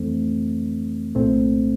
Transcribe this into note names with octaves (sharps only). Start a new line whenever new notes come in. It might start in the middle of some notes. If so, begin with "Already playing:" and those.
Already playing: F2 E3 A3 C4
C2 A#2 A3 C4